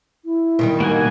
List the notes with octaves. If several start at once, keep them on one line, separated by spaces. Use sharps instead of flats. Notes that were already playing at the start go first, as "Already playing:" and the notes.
E4
B2 D#3 G3
A#3 D#4 F#4 G#5